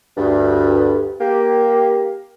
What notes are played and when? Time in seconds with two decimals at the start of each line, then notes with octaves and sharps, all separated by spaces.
0.17 D2 G2
1.20 A#3 G4